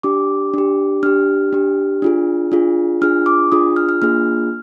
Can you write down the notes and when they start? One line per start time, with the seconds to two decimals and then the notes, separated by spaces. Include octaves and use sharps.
0.03 D4 G4 D6
0.54 D4 G4
1.03 D4 G4 F6
1.53 D4 G4
2.02 D4 F4 G#4
2.52 D4 F4 G#4
3.01 D4 F4 G#4 F6
3.26 D6
3.52 D4 F4 G#4 D#6
3.76 F6
3.89 F6
4.02 A#3 D4 F4 G#4 F6